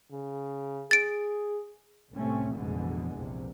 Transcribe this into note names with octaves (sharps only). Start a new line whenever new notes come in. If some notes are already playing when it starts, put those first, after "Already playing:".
C#3
G#4 A6 D7
C2 A2 C3 A3 C4 C#4
A1 F2 B2 D3 E3 G#3
A#1 E2 C3